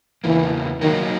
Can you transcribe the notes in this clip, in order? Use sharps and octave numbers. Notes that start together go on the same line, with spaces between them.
E2 C#3 E3 A#3
D#3 F#3 A#3 D#4